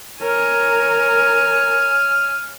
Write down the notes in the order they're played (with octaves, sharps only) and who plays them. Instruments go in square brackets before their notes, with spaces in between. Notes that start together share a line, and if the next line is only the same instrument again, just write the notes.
[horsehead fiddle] A#4 [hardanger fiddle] C#5 G#5 [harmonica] F6